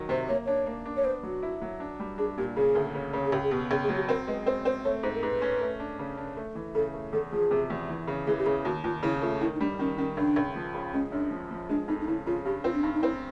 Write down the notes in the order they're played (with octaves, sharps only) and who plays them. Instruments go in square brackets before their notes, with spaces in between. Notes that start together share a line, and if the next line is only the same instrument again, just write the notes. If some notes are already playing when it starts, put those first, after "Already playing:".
Already playing: [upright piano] D#3 F#3
[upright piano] C3 [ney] C5
[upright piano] A#3 [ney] C#5
[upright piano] D4 [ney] C#5
[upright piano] A#3
D4
[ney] C#5
[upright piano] B3 [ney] C5
[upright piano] F#3 [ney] F#4
[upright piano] E4
F#3
D4
G3
[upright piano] D4 [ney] G#4
[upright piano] A#2 [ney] G4
[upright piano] C#3 [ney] G#4
[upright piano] D2
C#3
C#3
[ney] G#4
[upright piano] C#2 [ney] G4
[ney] G#4
[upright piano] B2 [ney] G4
[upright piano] C#2 [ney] G#4
[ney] G#4
[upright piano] F#3
[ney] G4
[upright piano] C4 [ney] A#4
[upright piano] G#3 [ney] B4
[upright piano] C4 [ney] C5
[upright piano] C4 [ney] C5
[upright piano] A3 [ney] C#5
[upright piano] G#2 [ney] C5
[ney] A#4
[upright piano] G#2 [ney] B4
[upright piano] C#4
A3
D4
C#3
D4
A3
E3
[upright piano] C#3 [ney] A4
[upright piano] A3
[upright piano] E2 [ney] A4
[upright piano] F3 [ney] G#4
[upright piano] C3
E2
E3
C#3
[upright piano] E3 [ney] G#4
[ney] G4
[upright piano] C#3 [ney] G#4
[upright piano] D#2 [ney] F#4
[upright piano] D#2 [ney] F4
[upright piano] C#3 [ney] E4
[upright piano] A3 [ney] F4
[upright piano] D#3 [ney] E4
[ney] D#4
[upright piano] G3 [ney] D4
[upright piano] D#3 [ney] C#4
[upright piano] D#3 [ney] C#4
[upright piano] C#2 [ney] D4
[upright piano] C#2
F3
C#3
[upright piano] G#3 [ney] C#4
[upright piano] F#2 [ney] D4
[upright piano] F3
F3
[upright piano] G#3 [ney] D4
[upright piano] F2 [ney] D#4
[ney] D#4
[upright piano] C#3 [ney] E4
[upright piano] C#3 [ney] F4
[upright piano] G2 [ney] G4
[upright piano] C4 [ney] F4
[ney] D4
[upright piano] G2 [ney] D#4
[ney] D#4
[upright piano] C4 [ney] E4